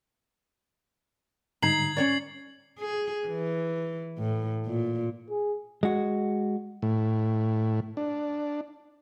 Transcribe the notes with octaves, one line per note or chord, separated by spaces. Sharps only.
G#2 D3 G3 D#4 A#5 G#6 C7 F#7
C#4 C#5 D5
G#4
E3
A2
A#2
G#4
G#3 F#4
A2
D4